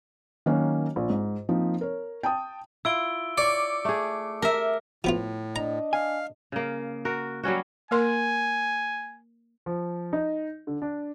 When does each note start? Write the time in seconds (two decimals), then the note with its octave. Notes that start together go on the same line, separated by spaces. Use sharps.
0.46 D#3 F#3 A#3 C#4 F#4
0.96 A#1
1.10 G#2
1.49 F3 A#3 C4 D#4
1.81 A#4 C#5
2.23 G5 A5 D#6
2.85 E4 F4 E6 D7 G7
3.38 C#5 D5 D6 C#7
3.85 A3 G#4
4.42 A#4 E5
5.04 A2 F3 B3 F4
5.56 D4 D#5 A#5
5.93 F5 G#5
6.52 C#3 A#3
7.05 F#4 A#4
7.43 F#3 G3 C#4 F#4
7.91 A#3 A#4 G#5 C6
9.66 F3
10.13 D#4
10.67 D3
10.82 D4